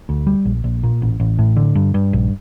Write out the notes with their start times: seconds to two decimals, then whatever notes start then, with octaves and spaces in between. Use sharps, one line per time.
0.09 D2
0.27 G3
0.45 A#1
0.64 A#1
0.83 A#2
1.02 A1
1.20 A1
1.39 A2
1.57 D3
1.75 G2
1.94 G2
2.13 A#1